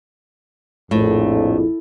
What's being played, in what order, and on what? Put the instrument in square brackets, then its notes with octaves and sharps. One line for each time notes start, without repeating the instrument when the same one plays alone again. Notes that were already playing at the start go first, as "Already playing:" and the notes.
[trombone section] A#1 F2 [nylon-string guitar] A2